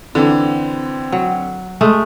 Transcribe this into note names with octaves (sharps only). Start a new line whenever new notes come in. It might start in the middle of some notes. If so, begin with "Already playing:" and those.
D3 E3 C4
F#3
G#3 A3